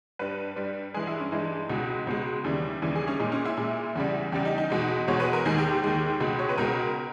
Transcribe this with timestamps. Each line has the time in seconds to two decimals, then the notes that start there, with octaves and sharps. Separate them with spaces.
0.19 G2 G3 B4
0.56 G2 G3
0.94 G2 E3 G#3 G#4
1.07 E4
1.20 C#4
1.32 G2 E3 G#3 D#4
1.70 C#2 B2 G#3
2.07 C#2 B2 G#3
2.44 D#2 C#3 E3 G3
2.82 D#2 C#3 E3 G3
2.95 G#4
3.08 C#4
3.20 A#2 G#3 D#4
3.32 C#4
3.45 E4
3.58 A#2 G#3
3.95 E2 C#3 G3
4.32 E2 C#3 G3 G4
4.45 D#4
4.58 D#4
4.70 E2 B2 G#3 D#4
5.07 E2 B2 G#3 C#5
5.20 B4
5.33 A#4
5.45 D#2 D#3 G#3 G#4
5.58 G4
5.71 G4
5.83 D#2 D#3 G#3
6.20 C#2 B2 G#3
6.39 C#5
6.49 B4
6.58 C#2 B2 G#3 A#4